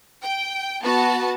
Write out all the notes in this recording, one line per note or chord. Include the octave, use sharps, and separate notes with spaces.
G5
B3 F#4 A5